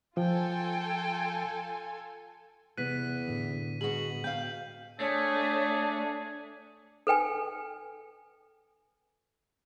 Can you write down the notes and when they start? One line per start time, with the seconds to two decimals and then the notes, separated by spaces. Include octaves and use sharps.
0.17 F3 F4 A4 G5 G#5
2.78 E2 C3 B3 F#6 B6 D#7
3.28 A2 D3
3.81 B2 F#4 G#4 F#7
4.24 B2 F5 G5 G6
5.00 A3 D4 G#4 C#5
7.07 A4 B4 G5 G#5